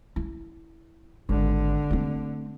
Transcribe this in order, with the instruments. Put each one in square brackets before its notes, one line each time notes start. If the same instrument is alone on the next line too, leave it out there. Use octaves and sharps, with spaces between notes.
[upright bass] E4
[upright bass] G#1 [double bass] D3
[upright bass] A3 C4